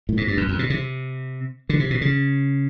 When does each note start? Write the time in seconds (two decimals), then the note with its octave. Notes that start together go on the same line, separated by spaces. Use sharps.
0.09 A2
0.17 G#2
0.28 G2
0.37 F#2
0.49 F2
0.59 B2
0.70 C3
1.69 D3
1.80 C3
1.91 B2
2.01 C#3